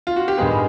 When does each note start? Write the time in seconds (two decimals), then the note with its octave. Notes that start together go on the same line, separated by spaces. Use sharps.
0.07 F4
0.16 F#4
0.28 G4
0.37 G2 D#3 G#3 B3 G#4